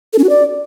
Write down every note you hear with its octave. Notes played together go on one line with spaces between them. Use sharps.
A4
C#4
F#4
D5